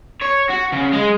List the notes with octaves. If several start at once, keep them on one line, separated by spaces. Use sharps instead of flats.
C#5
F#4
C#3
G#3